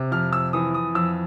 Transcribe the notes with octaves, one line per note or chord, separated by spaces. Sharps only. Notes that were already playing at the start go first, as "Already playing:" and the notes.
Already playing: C3
F2 F6
E6
E3 D#6
D#6
F2 E6